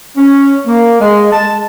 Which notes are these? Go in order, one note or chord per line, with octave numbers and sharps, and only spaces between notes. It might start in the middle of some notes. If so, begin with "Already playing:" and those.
C#4
A#3
G#3
A5